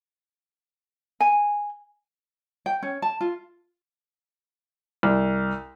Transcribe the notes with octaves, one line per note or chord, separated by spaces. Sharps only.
G#5
G5
C#4
A5
F4
C2